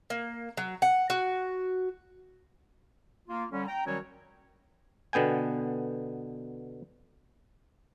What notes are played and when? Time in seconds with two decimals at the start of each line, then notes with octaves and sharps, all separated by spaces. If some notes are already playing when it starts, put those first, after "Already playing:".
0.10 A#3
0.57 F#3
0.82 F#5
1.10 F#4
3.28 A#3 F4
3.51 D3 G3 C#4
3.67 G5 A#5
3.85 D#3 F#3 G3 C#4 F#4 C#5
5.13 B2 D3 B3 G5 G#5